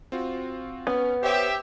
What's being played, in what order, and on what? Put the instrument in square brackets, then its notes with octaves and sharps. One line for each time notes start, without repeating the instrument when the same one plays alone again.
[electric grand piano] C4 F4 F#4
[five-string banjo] B3 [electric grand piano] C#4
[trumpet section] G4 E5 [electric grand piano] C5 C#5